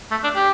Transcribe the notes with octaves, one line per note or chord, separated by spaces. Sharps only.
A3
D4
G4